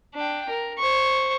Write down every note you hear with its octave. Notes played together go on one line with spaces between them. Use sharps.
D4 G5
A#4
C5 C#6